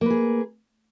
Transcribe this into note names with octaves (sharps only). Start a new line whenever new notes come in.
A#3 G#4 B4